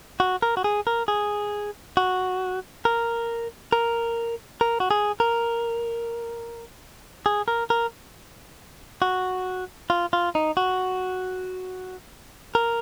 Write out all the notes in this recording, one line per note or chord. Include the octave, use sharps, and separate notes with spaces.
F#4
A#4
F#4
G#4
A#4
G#4
F#4
A#4
A#4
A#4
F#4
G#4
A#4
G#4
A#4
A#4
F#4
F4
F4
D#4
F#4
A#4